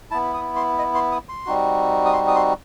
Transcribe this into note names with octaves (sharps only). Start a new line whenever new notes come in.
B3 E4 A5
D#6
C6
D#5
C6
D#6
C6
G3 C4 D#4 F#4
D#6
C6
D#6
C6